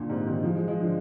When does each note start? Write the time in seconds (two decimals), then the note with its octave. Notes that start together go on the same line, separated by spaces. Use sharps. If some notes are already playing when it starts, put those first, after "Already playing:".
Already playing: A#2 D3
0.10 G#2 C3
0.27 C3 D#3
0.43 F3 G#3
0.55 F3 G#3
0.68 F3 G#3
0.80 D3 F3